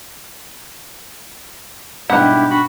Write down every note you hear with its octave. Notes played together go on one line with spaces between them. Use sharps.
G#2 B2 G3 D4 E4 G4 F#5 G5
F#4 B5